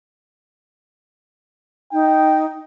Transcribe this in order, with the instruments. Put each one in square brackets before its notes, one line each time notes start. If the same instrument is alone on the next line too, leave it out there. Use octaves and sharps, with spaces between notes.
[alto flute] D#4 [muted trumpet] G5